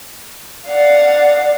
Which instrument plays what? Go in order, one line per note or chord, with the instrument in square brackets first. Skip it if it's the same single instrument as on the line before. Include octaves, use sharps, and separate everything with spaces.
[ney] D5 [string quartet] F5 F#5